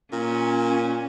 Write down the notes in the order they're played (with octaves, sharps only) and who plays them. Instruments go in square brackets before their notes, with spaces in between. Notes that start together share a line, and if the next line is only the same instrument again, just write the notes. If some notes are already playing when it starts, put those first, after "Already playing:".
[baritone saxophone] A#2 [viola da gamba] C#4